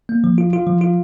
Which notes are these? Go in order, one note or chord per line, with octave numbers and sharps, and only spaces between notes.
A#3
F3
F4
F4
F3
F4